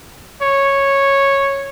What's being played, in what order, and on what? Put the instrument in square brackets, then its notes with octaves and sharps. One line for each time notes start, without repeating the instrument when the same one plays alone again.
[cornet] C#5